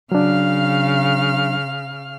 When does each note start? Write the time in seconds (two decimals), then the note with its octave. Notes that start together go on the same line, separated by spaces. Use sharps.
0.12 C#3 F#3 D4 F5 F6